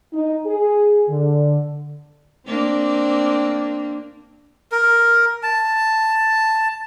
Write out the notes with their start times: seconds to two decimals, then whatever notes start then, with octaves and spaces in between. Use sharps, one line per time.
0.13 D#4
0.46 G#4
1.09 D3
2.47 A#3 C4 D4
4.72 A#4
5.43 A5